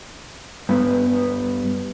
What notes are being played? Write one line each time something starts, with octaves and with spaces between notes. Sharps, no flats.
G2 B3